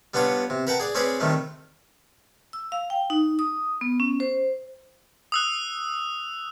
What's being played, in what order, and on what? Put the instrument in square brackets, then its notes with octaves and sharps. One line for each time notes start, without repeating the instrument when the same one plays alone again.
[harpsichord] G3 B3 D4 F4 C#5
C3
A#4 B4 F#5 G5 A5
G#4 D5
C4 C#4 G#4 B4 D5 B5
C3 D#3 G3 A3
[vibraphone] E6
F5
G5
D#4
D#6
B3
C#4
C5
[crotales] D#6 E6 F#6